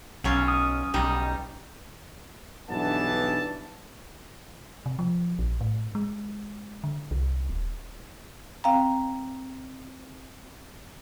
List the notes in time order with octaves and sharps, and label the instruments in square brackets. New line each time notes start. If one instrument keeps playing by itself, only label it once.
[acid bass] B1 [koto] F#3 C#4 F4
[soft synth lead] D#6
[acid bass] B1 [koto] G3 D#4
[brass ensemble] B1 G2 E3 B3 D4 A5
[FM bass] C3
F3
A#1
A2
G#3
D3
C2
D#1
[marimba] C4 F5 G5 A#5